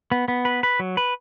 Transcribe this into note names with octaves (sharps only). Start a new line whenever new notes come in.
B3
B3
B4
B4
F#3
B4